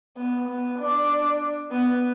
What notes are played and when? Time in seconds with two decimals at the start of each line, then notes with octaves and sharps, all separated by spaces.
0.17 B3
0.48 B3
0.79 D4
1.71 B3